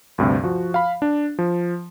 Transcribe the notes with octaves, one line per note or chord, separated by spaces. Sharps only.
D2 G2 C3
F3 F#4
F5 B5
D4
F3